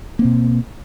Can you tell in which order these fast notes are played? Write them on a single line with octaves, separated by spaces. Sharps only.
A#3 C4 B2